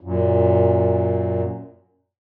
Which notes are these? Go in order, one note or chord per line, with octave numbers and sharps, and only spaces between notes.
F#2 A#2